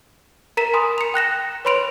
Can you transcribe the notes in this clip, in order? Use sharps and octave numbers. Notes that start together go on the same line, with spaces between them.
A#4 A#5 B6 D#7 E7
G#5 B5 C6 D#6
C#7 F7
G5 F#6 A#6 E7
B4 C#5 B5 C6 D7 F7